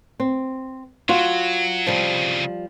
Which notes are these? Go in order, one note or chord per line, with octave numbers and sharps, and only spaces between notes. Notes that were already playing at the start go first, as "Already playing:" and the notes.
C4
F#3 F4 F#4
C2 C#3 F3 G3